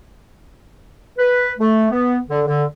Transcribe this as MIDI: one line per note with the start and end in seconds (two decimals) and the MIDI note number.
1.19 1.51 71
1.59 1.86 57
1.91 2.17 59
2.30 2.41 50
2.47 2.64 50